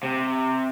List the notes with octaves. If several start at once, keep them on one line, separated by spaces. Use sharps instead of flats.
C3